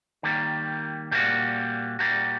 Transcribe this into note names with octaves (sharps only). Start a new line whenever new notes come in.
D#3 G3 A#3
A#2 G3 A#3 F#4
A#2 G3 A#3 F#4